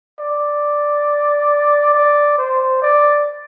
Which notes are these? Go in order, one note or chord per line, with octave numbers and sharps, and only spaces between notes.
D5
D5
C5
D5